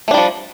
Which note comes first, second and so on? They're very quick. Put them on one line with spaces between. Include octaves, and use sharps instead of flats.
A3 D4 G3 F3